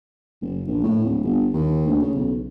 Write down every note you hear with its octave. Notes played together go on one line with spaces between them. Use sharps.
F#1
A#1
A2
D1
G1
D#2
D2
C#3
B1